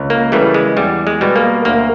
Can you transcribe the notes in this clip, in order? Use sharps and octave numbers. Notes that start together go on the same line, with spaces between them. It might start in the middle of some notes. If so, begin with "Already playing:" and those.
Already playing: C#2
A#3
C#3 E3 G3 A3
G#3
E2 G3
G#3
B2 G3
A#3
D2 A#3